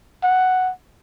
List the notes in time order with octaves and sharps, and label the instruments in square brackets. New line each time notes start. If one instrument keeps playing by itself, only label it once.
[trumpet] F#5